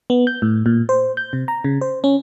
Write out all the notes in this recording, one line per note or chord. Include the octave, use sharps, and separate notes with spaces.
B3
G6
A2
A#2
C5
G6
C3
A#5
C#3
C5
C#4